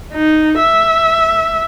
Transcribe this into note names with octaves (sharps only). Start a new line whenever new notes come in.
D#4
E5